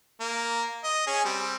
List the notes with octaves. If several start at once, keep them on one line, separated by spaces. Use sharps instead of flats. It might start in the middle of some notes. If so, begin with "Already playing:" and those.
A#3
D#5
C#4 G#4
G3 C4